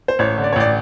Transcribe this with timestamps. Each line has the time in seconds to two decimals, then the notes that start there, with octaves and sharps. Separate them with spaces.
0.08 C5
0.19 A1 C#5
0.38 D3
0.44 D5
0.53 C#5
0.56 A1 D5